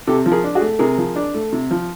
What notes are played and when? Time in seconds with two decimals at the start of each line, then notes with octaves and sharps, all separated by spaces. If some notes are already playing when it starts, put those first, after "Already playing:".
0.07 C3 G4 A4
0.26 F3
0.32 G#4 A#4
0.44 D4
0.55 F#4 G#4
0.61 A3
0.79 C3 G#4 A#4
0.98 F3
1.16 D4
1.34 A3
1.53 C3
1.71 F3